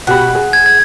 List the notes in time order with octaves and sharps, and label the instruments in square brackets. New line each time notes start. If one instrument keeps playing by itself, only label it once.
[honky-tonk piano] B2 G4 B5 [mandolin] F#5
[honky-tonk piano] G#4
[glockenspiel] G#6
G#6